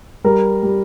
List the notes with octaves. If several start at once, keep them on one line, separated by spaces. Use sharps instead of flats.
G3 A#4
G3